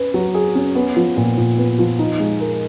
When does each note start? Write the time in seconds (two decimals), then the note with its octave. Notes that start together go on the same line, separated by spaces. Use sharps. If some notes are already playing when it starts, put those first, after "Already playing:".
Already playing: C#4 B4
0.14 F#3
0.35 G#4
0.55 C#4
0.75 B3
0.96 F3
1.17 A#2
1.37 A#2
1.58 B3
1.79 F3
1.99 D#4
2.20 G#3
2.40 A#4